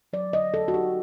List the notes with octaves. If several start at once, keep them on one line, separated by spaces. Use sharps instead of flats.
F#3 D5
D3 D#5
D3 A4
F#4
D#4 G4